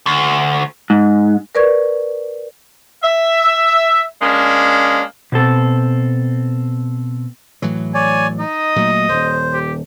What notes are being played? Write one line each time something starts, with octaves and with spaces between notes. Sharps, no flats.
D2
G#2
A#4 B4 D5 C#6 G#6
E5
G#3 A#3 C#4 D4
B2 C4 A4
A2 E3 F#3
C#5 D5 G#5
D#4 D#5
A#2 F#3 A3
D#1 C5
G4